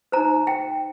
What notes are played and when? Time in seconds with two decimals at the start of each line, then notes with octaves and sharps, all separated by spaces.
0.12 D#4 C5 A#5
0.47 G5